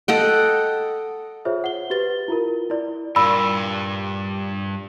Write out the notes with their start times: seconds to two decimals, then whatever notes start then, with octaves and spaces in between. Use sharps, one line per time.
0.08 A4 D#5 F#5 G5
1.45 F4 G#4 C5 C#5 E5
1.64 F#5 G7
1.90 F#4 G4 B4 A6 G7
2.28 E4 F4 A#4
2.70 E4 D5
3.16 G2 A#2 B5 E6